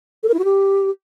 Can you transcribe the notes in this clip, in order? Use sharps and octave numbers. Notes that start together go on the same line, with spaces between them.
A4
A#4
E4
F#4
G4